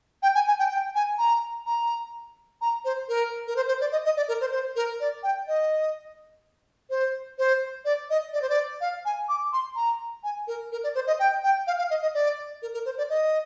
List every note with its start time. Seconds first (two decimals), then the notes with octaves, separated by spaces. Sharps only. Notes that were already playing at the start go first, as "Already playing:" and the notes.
0.23 G5
0.35 G#5
0.48 G#5
0.59 G5
0.71 G5
0.95 G#5
1.18 A#5
1.66 A#5
2.61 A#5
2.85 C5
3.09 A#4
3.47 A#4
3.56 C5
3.68 C5
3.81 D5
3.92 D#5
4.05 D#5
4.17 D5
4.28 A#4
4.41 C5
4.52 C5
4.76 A#4
5.00 D5
5.23 G5
5.48 D#5
6.90 C5
7.38 C5
7.85 D5
8.10 D#5
8.33 D5
8.42 C5
8.49 D5
8.81 F5
9.05 G#5
9.29 D6
9.53 C6
9.76 A#5
10.24 G#5
10.47 A#4
10.72 A#4
10.84 D5
10.95 C5
11.07 D#5
11.20 G5
11.44 G5
11.67 F5
11.78 F5
11.90 D#5
12.02 D#5
12.14 D5
12.62 A#4
12.74 A#4
12.85 C5
12.98 D5
13.10 D#5